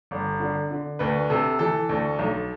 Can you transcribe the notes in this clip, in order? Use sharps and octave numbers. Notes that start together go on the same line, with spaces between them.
G1
D3
D3
D2 B4
C3 A4
E3 A4
D2
B1